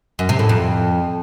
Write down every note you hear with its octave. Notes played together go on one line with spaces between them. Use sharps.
F#2
C3
A2
F2